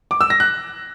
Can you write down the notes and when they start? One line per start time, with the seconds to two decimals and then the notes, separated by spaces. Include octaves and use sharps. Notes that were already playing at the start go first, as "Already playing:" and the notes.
0.11 D6
0.21 E6
0.30 A#6
0.40 F#6